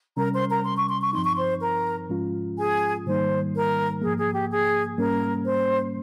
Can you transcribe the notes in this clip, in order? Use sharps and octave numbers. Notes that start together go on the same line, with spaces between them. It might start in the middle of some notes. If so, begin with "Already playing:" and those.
C3 G3 C#4 A#4 A#5
C5 C6
A#4 A#5
C6
C#6
C6
C#6
G2 F3 C4 D#4 C6
C#6
C5 C6
A#4 A#5
G#2 F3 G#3 C#4 F4
G#4 G#5
G#2 D#3 G3 A#3 D#4 C5
A#4
G#2 F3 A#3 G#4
G#4
G4
G#4
G#2 G3 A#3 C#4 A#4
C5